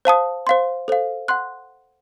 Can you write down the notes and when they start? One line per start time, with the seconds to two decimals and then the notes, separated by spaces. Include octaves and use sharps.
0.05 C5 F5 A5 D#6
0.47 C5 F5 C6
0.88 A4 C5 F5
1.28 F#5 C6 F#6